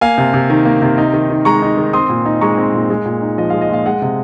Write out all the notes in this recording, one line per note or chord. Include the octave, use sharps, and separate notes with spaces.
A#3 F5 G#5
C3
C3
D#3
A#3
C3
D#4
D#3
D#3
G#3 A#5 C#6
D#4
D#3
C4 C6 D#6
A#2
D#4
G#3 A#5 C#6
C4
A#2
G#3
A#2
D#4
F3 D#5
G#3 F5
D#5
A#2 F5
G#3 D#5 F#5
C3